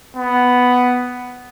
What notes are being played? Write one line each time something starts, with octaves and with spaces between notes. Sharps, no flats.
B3